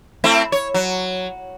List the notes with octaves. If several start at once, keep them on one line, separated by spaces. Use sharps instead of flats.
A3 C4 E4
C#5
F#3